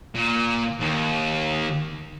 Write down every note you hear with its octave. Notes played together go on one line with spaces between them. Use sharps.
A#2
D#2